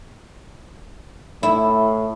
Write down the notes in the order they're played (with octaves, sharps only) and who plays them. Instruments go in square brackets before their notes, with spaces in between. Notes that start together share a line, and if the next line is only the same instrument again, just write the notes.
[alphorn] A2 [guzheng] E4